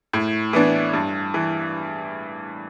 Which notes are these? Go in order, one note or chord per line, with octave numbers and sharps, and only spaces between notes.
A2
E3 B3 D4
G2
E3